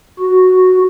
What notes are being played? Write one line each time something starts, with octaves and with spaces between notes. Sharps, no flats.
F#4